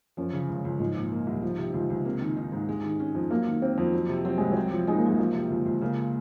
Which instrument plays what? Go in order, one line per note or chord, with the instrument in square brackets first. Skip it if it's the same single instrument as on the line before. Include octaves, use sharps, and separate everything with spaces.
[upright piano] F#2 [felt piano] F3
[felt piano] C#3
C#2
C#2
[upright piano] G#2 [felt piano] F3
[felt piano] A#2
A#3
C2
F3
C3
C#2
C#2
[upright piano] C3 [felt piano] A#3
[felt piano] D#3
D#4
G#2
G#3
D#3
C#4
F2
[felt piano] F#3 [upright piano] A#3
[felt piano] D#3
[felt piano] A#3 [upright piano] C4
[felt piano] F2
F#3
C3
[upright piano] F#3 [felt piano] C4
[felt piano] C2 [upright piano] G#3
[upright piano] F#3 [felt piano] C4
[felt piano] F3
[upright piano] G#3 [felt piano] D#4
[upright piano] A#3
[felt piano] F#2 [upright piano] G#3
[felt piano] F3 [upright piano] A#3
[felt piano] C3
C#2
C#2
[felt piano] C#3 [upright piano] A#3